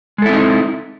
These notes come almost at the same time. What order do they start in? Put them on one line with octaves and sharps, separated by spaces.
G#3 A4 E4 C4 D#4